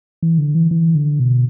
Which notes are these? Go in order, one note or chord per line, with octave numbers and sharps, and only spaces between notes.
E3
D3
E3
E3
D3
B2